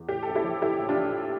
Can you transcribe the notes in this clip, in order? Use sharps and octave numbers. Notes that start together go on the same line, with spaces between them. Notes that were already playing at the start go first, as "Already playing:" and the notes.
Already playing: E2
A2 G4
A#1 A4
E4 G4
F3
A#1 E4 G4
A2
D4 F4
A#1